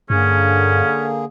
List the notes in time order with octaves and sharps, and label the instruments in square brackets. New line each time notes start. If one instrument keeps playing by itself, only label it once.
[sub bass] G2 [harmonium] D3 A#3 G#4 [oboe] C#4